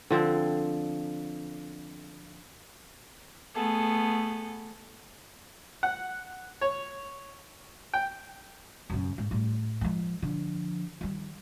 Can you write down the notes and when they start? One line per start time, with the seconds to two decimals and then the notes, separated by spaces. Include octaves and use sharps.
0.10 D3 F3 C4
3.55 A3 B3 G#4 A4
5.83 F#5
6.61 C#5
7.94 G5
8.90 F#2 C#3
9.18 G#2
9.31 A2 G3
9.81 F3 G#3
10.22 D3 F3
11.01 D#3 G3